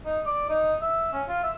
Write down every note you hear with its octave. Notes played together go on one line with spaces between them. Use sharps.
D#4
D5
D#4
E5
C#4
F4
E5